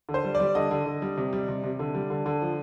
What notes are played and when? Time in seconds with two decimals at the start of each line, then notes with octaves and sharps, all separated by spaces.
0.09 D3
0.14 C5
0.24 G3
0.35 D5
0.40 G3
0.55 D3 D#5
0.71 D3
0.86 D3
1.02 G3
1.18 C3
1.33 G3
1.48 C3
1.64 C3
1.79 D3
1.95 G3
2.10 D3
2.26 D3
2.42 F3